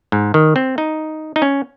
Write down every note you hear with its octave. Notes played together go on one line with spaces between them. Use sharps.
G#2
D#3
C4
D#4
D#4
C#4